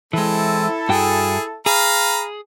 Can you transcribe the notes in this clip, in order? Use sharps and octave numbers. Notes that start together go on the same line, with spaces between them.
E3 G#3 C4 E4 A4
G2 F#4 G#4 G5
G#4 F5 A#5 B5